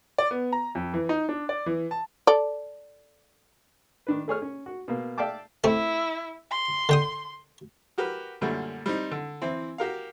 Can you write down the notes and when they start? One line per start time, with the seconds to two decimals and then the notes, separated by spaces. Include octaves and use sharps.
0.18 D5
0.31 B3
0.52 A#5
0.75 F2
0.94 E3
1.09 D#4
1.29 D4
1.49 D5
1.66 E3
1.91 A5
2.27 A4 D5
4.07 D#3 D4 B4
4.28 A3 G#4 C#5 F6
4.42 C#4
4.66 F#4
4.88 B2 A#3
5.18 D5 E5 F5 G5 A5 D6
5.64 A3 C4 E4
6.51 C6
6.89 D3 G5 D#6
7.98 F#4 G4 A#4 B4
8.41 F#2 A#2 D3 G3 A3
8.86 G3 C4 D#4
9.11 D3
9.41 E3 C4 E4
9.78 F#4 G4 A#4 F5